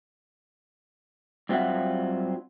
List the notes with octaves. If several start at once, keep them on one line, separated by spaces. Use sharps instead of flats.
G2 F#3 C4 F4 E5 F#5